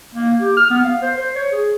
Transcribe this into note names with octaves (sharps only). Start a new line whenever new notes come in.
A#3
G4
F6
B3
F5
C5
C5
C#5
G#4